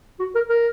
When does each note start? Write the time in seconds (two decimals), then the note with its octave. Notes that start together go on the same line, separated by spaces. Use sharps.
0.19 F#4
0.35 A#4
0.49 A#4